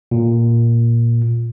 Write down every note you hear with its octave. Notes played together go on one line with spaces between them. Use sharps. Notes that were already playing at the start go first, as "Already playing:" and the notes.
A#2